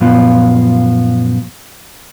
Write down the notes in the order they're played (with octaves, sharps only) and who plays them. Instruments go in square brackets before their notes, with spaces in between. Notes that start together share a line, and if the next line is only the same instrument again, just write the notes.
[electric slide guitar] F#2 A#2 F3 B3 F4